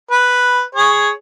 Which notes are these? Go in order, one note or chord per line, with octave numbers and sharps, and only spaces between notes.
B4
G#4 C#5